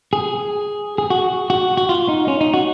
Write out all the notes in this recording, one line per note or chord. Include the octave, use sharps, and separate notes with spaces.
G#4
G#4
F#4
F#4
F#4
F4
D#4
C#4
D#4
F#4